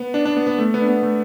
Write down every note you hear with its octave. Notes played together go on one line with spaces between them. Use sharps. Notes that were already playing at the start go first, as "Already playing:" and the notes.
Already playing: B3
D4
D4
B3
B3
A3
B3
D4
B3
A3